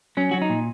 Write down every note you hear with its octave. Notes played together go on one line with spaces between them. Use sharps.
F#3 C#4
F#3 F#4
D#4
A#2